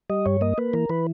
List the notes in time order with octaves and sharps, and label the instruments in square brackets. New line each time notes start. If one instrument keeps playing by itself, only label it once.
[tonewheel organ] G3 D#5
G2 C#5
A#3 D#5
A#3 B4
E3 A#4
E3 B4